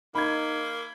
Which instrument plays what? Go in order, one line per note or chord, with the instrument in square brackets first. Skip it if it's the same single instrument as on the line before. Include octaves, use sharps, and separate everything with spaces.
[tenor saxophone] A#3 [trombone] D#4 [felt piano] B5 G#6